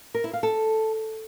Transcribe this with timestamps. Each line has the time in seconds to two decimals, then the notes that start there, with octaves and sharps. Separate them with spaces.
0.14 A#4
0.24 E4
0.33 F5
0.43 A4